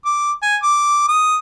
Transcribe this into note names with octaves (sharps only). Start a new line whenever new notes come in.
D6
G#5
D6
D#6